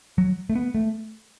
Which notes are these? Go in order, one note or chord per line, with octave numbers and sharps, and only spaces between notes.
F#3
A3
B3
A3